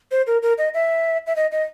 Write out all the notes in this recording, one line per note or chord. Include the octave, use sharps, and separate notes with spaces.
C5
A#4
A#4
D#5
E5
E5
D#5
D#5